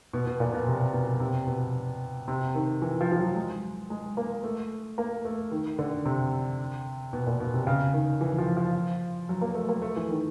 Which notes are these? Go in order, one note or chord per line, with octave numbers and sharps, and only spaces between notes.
B2
B2
A#2
B2
C3
B2
C3
B2
C3
D#3
E3
F3
F3
F#3
G#3
G#3
A#3
A3
A#3
A3
D#3
D3
C3
B2
A#2
B2
C3
C#3
D#3
E3
E3
F3
F3
F#3
A#3
A3
A#3
A3
E3
D#3